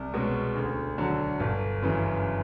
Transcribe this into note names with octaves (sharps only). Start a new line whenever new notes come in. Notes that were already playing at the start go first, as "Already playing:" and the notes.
Already playing: C2
B2 G#3 C#4
D2
D3 F#3
G1
F#2 C#3 E3